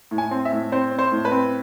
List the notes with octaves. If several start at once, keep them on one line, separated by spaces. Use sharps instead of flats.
A2
G#5
C4
E5
A2
C4 C5
C4
C5
A2
B4
C4